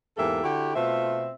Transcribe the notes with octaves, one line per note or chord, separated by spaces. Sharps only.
E2 G#2 A#3 G4 A4 E5
D3 E4 F#4 G4
B2 A3 C4 F4 E5